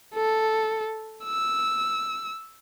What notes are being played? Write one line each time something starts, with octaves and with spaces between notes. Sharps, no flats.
A4
E6